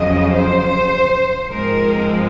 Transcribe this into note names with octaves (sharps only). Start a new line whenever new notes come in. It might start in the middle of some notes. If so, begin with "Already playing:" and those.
Already playing: F2 C#3 F#3 D#5
C5
G#2 F3 G#3 C4 A#4